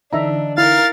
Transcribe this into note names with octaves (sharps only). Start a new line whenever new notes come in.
D3 E3 D4 D#4 E5 A#5
E4 A#4 F5 A6